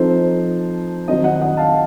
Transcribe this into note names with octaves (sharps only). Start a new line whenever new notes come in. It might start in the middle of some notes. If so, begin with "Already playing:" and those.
Already playing: F3 C4 D#4 A4 C5
D#3 F#3 C4 C5 D#5
D#5 F#5
D#5 F#5
F5 A5